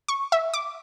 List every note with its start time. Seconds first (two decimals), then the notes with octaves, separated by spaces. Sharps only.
0.08 C#6
0.32 E5
0.54 D6